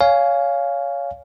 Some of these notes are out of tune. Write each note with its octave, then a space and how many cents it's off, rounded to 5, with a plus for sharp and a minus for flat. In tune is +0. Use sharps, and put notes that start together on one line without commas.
C#5 +20 F5 +0 G#5 +0